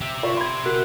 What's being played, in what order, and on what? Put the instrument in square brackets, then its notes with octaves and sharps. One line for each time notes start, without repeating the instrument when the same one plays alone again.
[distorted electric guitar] G4 E5
[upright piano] F4 D5 C#6
[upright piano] B5 G#6 [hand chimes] C6
[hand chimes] F#4 A#4 F#6